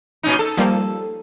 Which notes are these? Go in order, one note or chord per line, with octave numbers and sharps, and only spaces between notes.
A#2 C#4 D#4
A4
F3 G3 A#3